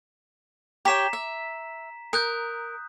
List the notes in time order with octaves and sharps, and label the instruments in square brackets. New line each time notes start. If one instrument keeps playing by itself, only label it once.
[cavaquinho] G4 C#5 G5 [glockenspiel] A#5 B6 E7
[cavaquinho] E5
[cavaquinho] A#4 [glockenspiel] D#6 F#6 G6